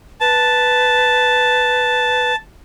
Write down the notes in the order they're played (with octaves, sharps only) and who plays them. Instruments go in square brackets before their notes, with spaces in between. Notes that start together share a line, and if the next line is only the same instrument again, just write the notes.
[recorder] B4 [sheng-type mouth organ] A5